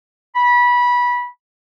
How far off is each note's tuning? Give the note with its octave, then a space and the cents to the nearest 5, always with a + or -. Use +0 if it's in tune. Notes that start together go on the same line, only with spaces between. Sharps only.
B5 -20